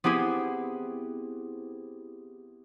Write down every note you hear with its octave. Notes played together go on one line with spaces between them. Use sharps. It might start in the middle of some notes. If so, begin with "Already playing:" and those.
B3 C4 E4 G4 G#4